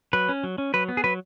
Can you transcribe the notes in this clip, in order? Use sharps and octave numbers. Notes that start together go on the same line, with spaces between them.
F#3 B4
C#4
F#3
C#4
F#3 B4
B3
G#4
F#3 B4